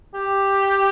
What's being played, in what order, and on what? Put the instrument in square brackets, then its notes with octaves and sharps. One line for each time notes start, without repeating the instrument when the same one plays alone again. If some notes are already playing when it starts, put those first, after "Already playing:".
[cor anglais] G4